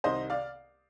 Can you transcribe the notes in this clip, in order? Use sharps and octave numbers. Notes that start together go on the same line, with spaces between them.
C2 C3 D#3 C5 D#5
D5 F5